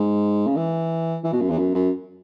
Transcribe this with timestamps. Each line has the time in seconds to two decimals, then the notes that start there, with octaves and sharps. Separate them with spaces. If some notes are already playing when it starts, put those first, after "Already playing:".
Already playing: G#2
0.47 C#3
0.56 E3
1.24 E3
1.33 B2
1.41 F#2
1.50 E2
1.58 F#2
1.75 F#2